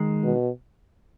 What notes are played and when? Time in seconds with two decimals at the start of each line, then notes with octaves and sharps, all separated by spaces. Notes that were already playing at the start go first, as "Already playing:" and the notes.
Already playing: D#3 G#3
0.23 B2